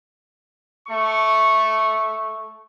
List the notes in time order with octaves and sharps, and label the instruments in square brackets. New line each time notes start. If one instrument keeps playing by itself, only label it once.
[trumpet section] A3 C#6